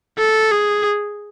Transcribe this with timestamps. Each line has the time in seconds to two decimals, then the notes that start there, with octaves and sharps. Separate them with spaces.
0.19 A4
0.51 G#4